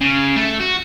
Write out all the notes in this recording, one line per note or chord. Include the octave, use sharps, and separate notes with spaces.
C#3
A3
F#4